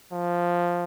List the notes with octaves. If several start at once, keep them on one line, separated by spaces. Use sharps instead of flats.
F3